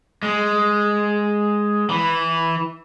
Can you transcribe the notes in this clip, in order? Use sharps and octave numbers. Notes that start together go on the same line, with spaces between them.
G#3
E3